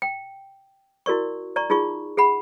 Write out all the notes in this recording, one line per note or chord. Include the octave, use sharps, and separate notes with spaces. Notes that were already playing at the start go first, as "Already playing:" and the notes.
G5
E4 F#4 A#4 D5 C#6
D5 A#5 C#6
D#4 F4 G#4 C#6
G#4 F#5 B5